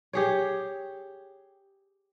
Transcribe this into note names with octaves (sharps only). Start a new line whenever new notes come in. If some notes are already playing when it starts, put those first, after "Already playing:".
G4 G#4 C#5